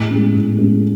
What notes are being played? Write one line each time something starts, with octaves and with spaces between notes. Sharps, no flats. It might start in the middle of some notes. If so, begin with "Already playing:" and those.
Already playing: A2
G#3 C#4
A2
G#3 C#4